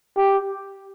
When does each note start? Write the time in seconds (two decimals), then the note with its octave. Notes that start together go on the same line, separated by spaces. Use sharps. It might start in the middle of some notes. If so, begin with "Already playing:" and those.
0.17 G4